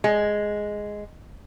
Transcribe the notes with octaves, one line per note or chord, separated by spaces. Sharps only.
G#3